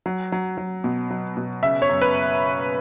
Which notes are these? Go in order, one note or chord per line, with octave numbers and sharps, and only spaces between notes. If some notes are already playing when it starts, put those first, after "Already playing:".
F#3
F#3
F#3
B2
F#3
B2
C#3 E5
C#5
F#2
B4